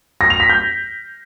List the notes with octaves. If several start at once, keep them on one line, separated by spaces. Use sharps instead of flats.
A#6
F7
B6
G6